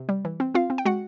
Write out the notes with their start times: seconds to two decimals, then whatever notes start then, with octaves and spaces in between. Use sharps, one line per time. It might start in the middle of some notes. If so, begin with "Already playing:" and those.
Already playing: C3
0.09 G3
0.25 E3
0.40 C4
0.54 C4 F4 F5
0.70 C4
0.78 G5
0.85 G#3 F#4 F#5